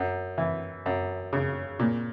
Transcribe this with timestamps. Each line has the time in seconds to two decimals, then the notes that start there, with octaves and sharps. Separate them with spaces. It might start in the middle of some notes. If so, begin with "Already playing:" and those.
Already playing: F#2
0.38 E3
0.86 F#2
1.33 C#3
1.79 A#2